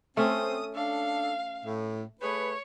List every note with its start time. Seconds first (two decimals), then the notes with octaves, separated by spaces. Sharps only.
0.17 A3 C4 C#4 D#6
0.75 D4 A4 F5
1.65 A2
2.22 A3 G#4 B4 C#5